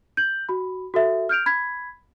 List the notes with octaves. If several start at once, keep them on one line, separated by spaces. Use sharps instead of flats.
G6 F#7
F#4 B5
F#4 A4 E5
F6 G6 D7 F7
B5 G#6 B6